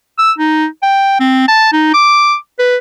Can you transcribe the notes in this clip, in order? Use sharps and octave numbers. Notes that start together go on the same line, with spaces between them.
E6
D#4
G5
C4
A5
D#4
D6
B4